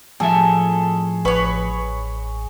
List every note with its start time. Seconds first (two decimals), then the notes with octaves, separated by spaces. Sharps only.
0.20 A2 F3 G#4 A4 E5
1.25 A1 B4 C#5 C#6